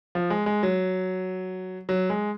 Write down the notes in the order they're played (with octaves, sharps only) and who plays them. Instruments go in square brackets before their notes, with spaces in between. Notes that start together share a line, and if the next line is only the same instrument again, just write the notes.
[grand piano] F3
G#3
G#3
F#3
F#3
G#3